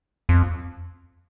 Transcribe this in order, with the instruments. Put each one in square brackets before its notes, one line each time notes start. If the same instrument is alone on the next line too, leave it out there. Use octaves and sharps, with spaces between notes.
[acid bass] F2